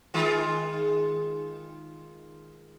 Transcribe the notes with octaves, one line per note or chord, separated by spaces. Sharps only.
D#3 G#3 F4